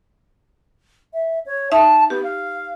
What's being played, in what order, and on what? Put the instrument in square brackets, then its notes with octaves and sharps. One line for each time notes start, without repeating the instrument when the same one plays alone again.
[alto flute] E5
C#5
[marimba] D#4 E5 [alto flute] A5
[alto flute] B3 [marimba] G4
[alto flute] F5